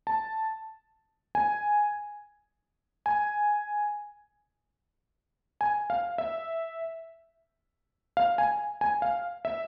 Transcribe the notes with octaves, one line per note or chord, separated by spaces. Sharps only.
A5
G#5
G#5
G#5
F5
E5
F5
G#5
G#5
F5
E5